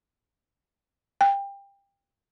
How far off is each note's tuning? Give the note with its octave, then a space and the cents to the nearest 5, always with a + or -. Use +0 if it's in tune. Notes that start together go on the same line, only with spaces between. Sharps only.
G5 +25